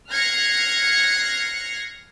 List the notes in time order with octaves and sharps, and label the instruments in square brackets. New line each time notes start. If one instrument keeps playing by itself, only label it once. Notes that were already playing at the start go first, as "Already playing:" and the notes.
[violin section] F6 F#6 G#6 A#6 C7 C#7